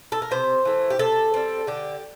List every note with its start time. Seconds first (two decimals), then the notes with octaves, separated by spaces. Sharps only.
0.12 A4
0.22 A#4
0.31 C3 C5
0.65 E3 A3
0.90 G4
0.99 C3 A4
1.34 G3 C4
1.67 D3 G4